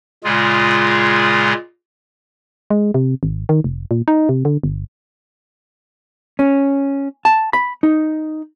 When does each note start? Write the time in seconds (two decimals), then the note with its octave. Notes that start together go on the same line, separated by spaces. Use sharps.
0.24 A#2 C#3 G#3 F4 G#4
2.70 G#3
2.94 C3
3.23 G#1
3.49 D#3
3.64 F1
3.91 A#2
4.08 D#4
4.29 C3
4.45 D3
4.64 G1
6.39 C#4
7.25 A5
7.53 B5
7.83 D#4